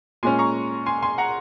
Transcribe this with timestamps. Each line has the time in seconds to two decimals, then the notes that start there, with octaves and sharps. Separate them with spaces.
0.23 A#2 G#3 C#4 G#5 C6
0.39 A#5 C#6
0.86 G#5 C6
1.02 G#5 C6
1.18 F#5 A#5